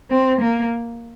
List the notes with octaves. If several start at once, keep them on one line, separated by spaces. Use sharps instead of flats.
C4
A#3